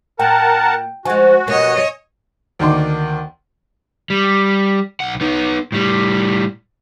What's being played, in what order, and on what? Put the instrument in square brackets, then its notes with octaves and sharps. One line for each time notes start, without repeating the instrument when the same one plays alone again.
[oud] A#2 [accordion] A#4 F#5 A5 [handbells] G5
[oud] F3 G#3 [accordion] F#4 [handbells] G#5
[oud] B2 A#3 G4 [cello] C#5 D#5
[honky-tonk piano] D2 D#3 A#3 D5 C6 D6
[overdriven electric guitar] G3
B1 F#5
B3 D#4
A2 G3